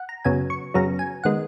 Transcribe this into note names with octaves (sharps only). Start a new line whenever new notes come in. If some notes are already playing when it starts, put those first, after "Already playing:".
Already playing: F#5
A#5
F#2 C#3 F#3 B3 G#5
C#6
F#2 C#3 F#3 B3 A#5
G#5
D#3 G#3 B3 F#5